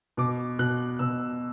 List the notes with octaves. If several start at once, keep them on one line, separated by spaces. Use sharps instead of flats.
B2 D6
B2 F#6
B2 E6